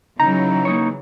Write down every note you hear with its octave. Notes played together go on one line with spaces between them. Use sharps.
C#3 E3 F#3 D#4 A#5
A#3 D#4 C#5